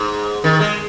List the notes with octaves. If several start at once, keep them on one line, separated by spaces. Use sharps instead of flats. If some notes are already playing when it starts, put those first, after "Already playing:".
Already playing: G#2
D#3
G#3